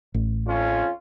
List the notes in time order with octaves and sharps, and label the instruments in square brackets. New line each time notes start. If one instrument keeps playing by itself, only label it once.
[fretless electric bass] A1
[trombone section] F2 C#4 F4